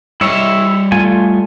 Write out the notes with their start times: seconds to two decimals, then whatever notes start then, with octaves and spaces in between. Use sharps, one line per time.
0.21 G3 E4 C#5 D#5 E5
0.92 A3 F4 G#5